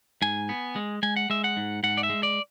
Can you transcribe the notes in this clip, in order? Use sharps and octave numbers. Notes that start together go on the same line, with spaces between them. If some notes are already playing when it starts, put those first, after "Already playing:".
G#2 G#5
B3
G#3
G#3 G#5
F#5
G#3 E5
F#5
G#2
G#2 F#5
D5
E5
G#3
D5